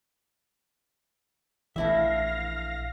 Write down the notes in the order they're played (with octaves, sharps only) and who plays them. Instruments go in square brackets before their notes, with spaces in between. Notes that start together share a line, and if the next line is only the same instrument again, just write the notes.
[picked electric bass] A#1 E3 [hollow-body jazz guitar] A3 E4 E5 [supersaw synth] F5 A#6